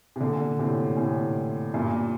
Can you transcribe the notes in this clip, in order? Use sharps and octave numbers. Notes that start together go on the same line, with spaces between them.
C3
A#2 D3
A2 C3
A2 C3
G2 A#2